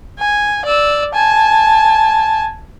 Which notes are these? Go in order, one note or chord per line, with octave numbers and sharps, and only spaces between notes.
G#5
D5 E6
G#5 A5